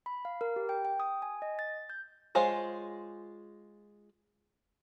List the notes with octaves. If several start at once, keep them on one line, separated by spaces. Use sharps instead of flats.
B5
F5
A#4
G4
G5
G5
D#6
G#5
D#5
A6
G6
G#3 F4 G#4 C5 C#5